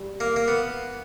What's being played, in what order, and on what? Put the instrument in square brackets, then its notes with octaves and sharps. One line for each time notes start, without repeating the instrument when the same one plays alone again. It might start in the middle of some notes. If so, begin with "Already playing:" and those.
Already playing: [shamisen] G3
[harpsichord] A#3
A#3
B3